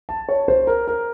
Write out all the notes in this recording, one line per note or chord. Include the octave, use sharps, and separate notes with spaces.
A5
C#5
C5
A#4
A#4